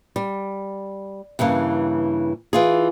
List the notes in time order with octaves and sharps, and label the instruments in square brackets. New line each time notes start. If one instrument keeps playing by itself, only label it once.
[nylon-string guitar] G3
G2 C#3 E3 A#3
E3 F4 G#4